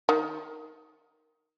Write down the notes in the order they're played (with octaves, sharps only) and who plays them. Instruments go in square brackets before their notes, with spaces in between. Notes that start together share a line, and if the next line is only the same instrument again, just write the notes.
[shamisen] D#3